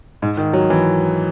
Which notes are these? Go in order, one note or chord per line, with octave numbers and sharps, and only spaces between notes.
G#2
D#3
F#3
E3